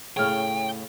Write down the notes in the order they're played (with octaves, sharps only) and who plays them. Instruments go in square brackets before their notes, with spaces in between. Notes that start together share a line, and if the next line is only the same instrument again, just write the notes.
[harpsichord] A2 C#3 [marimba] G#4 F6 [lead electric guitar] G5